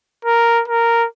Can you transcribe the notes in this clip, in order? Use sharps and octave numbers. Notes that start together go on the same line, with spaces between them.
A#4
A#4